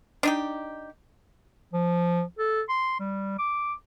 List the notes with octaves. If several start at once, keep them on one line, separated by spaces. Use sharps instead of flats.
D4 D#4 G4
F3
A4
C6
G3
D6